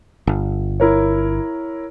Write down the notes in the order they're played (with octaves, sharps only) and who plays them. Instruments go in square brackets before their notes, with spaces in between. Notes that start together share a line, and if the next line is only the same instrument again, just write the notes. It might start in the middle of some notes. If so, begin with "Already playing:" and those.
[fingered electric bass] G1
[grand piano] E4 A#4 C#5